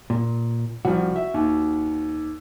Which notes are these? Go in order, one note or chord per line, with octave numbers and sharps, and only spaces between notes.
A#2
C2 F3 F#4
E5
D#2